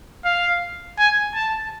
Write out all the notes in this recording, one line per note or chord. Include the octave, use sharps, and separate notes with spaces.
F5
G#5
A5